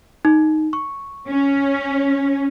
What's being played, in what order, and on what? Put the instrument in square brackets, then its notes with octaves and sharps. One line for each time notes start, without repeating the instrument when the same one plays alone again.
[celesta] D#4
C#6
[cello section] C#4